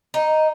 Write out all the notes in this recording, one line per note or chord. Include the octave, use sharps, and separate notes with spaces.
D#4